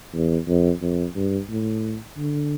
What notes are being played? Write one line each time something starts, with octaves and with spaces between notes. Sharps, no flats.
E2
F2
F2
G2
A2
D3